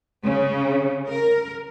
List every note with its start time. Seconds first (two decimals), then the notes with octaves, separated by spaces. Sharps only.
0.24 C#3
1.09 A#4